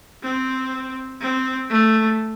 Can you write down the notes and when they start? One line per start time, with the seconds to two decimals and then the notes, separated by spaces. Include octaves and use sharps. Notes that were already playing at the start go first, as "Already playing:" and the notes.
0.23 C4
1.21 C4
1.70 A3